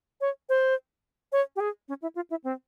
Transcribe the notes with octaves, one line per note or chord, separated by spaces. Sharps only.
C#5
C5
C#5
G4
G#4
C#4
E4
F4
E4
C4